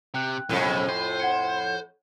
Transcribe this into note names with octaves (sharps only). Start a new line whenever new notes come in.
C3 G5 F#6
B1 F2 A2 C#3
C5
F#5 G#6 C#7